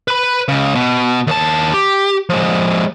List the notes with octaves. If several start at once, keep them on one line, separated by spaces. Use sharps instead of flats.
B4 B5
C#2 C#3
B2
D#2 A5
G4
F3 G#3